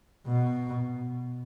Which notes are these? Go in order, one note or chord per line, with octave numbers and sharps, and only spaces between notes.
B2